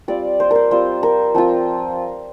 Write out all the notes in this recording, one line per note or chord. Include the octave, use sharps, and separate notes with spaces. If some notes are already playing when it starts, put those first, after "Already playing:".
G3 C4 F4 D5
C5
A#4 C5
G3 C4 F4 C5
A#4
F3 C4 F4